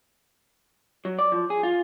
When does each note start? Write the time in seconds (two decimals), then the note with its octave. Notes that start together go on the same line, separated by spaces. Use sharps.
1.05 F#3
1.18 D5
1.32 F3
1.50 G#4
1.63 F4